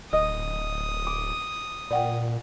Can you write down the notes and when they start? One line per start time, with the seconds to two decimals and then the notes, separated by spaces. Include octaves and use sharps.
0.13 D1 D#5 D#6
1.07 D6
1.91 A#2 D5 F#5 G5